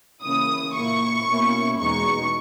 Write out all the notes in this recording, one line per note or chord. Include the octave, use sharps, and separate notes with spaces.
C#3 E3 A#3 C#4 E4 D#6
A#2 A#3 E4 C#6
B2 A#3 C#4 E4
E2 B2 G#3 B3 D#4 C#6